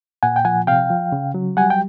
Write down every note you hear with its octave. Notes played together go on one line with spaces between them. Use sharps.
A#2 F#5 G#5
G5
F3 F#5 G#5
C3 F5 G5
F3
C#3
F#3
G3 F#5 G#5
G5